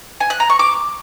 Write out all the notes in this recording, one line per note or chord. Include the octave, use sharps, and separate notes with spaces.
G#5
F#6
A#5
C#6
D6